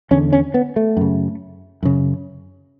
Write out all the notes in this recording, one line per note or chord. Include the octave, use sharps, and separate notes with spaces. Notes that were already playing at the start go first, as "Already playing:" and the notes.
E2 D3 C#4
C#4
B3
A3
F#2 C#3
F#2 C#3